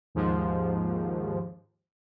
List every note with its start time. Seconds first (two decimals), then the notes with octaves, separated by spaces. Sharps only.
0.15 D#2 G#2 F3